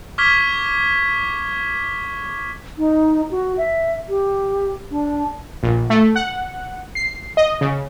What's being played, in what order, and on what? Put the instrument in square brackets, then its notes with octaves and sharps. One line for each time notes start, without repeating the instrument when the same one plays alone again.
[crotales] C#6 D6 F6 G#6 B6 G7
[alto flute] D#4
F#4
E5
G4
D4
[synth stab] A#1
A3
F#5
C7
D#5
C#3